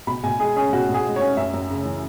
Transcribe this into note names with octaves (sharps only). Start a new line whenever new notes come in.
B2 B5
B2 G#5
G#3 G#4
C#4 G#4
B2 F#4
B2
G#4
G#3
C#5
C#4
F#2 E5
F#2
C#3
E3